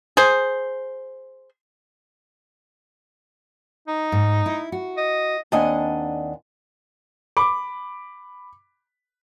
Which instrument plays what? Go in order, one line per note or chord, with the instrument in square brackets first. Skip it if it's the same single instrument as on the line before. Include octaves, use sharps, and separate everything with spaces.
[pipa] G#4 C5
[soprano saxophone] D#4
[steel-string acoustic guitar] G#2
E4
F#4
[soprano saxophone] D#5
[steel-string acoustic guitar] D#2 C4 D4 D#5 F#5 G#5
[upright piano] B5 D6